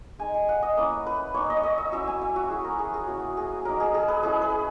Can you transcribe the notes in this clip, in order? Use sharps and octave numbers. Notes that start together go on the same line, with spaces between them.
G#3 D#4 G#5
G#5
F#5
D#5
A#3 C#4 E4
B4
A#3 D#4 C#5
D#5
C#5
D#5
E5
F#3 C#4 E4 E5
G#5
E5
F#4
A#3 E4 G#4
A#4
G#4
G#4
A#3 C#4 E4 F#4
G#4
F#3 A#3 D#4 A#4
G#4
G#4
B4
G#3 C#4 E4 G#4
B4